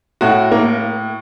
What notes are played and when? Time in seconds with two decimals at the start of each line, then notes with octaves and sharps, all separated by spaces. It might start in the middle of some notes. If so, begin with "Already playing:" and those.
0.21 A2 F#4
0.52 A#3